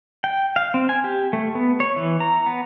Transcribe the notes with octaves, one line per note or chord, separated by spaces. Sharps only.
G5
F5
C4
G#5
G4
A3
B3
C#5
E3
A#5
B3